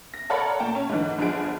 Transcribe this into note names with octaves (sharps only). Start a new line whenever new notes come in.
A#6
A4 A#4 C#5 D5 F#5 B5
A#2 G5 A5 A#5
C#4
G#2 D3 E3
G1 D3 F3 G#4 D7